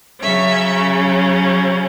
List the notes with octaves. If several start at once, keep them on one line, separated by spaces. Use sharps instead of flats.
C#3 F#3 C#4 E5